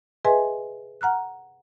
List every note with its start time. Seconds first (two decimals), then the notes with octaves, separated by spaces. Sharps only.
0.25 G#4 B4 D#5 E5 G#5 C6
1.01 F#5 A#5 F6 F#6